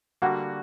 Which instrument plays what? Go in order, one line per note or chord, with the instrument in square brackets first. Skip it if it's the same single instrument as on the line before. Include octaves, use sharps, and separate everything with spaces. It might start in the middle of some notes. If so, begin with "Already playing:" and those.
[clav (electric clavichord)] D3 G3 A#3 [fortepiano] F#4